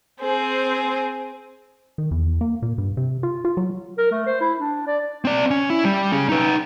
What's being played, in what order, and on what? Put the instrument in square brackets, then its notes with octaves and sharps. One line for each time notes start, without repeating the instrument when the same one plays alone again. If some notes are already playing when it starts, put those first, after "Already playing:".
[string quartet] C4 G#4 C5
[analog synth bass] D#3
E2
A#3
A#2
G2
C3
F4
F4
F#3
[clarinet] A#4
A3
C5
E4
D4
D5
[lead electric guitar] C4 D5
C#4
E4
G3
C#4 G#4
D#4 B4